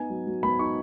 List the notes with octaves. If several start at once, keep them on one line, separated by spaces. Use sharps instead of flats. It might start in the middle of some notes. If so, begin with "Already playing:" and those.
Already playing: B3 D#4 G#5
F#3
F#3
B3 B5
D#4 C#6